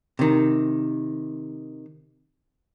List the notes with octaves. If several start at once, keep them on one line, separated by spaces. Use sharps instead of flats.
C3 D#3